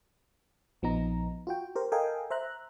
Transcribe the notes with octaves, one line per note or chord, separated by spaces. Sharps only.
A#1 F3 B3 D#4 A#5
F4 F#4 G5
G4 A#4 C5
A4 A#4 D#5 F5 G5 G#5
C5 E5 A#5 F#6